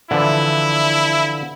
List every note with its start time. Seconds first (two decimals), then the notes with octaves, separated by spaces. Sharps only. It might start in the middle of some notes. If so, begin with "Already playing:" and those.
0.11 D3 E3 F3 E4